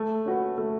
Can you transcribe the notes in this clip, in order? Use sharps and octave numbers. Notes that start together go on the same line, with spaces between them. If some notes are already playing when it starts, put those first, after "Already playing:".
Already playing: A3
C#4 F#4 B4
A3